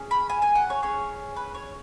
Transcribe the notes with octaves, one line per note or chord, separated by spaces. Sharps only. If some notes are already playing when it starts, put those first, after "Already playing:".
Already playing: C#4 G#4
B5
G#5
G#5
F#5
C#5
C#4 G#4 C#5
B4
C#5